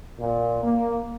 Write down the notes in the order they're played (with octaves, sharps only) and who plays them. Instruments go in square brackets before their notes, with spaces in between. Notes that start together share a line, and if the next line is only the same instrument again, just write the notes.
[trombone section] A#2
A#3